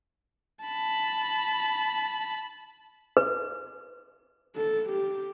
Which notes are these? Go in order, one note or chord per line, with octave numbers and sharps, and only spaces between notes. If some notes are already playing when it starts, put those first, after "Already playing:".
A5 B5
B4
A4
G4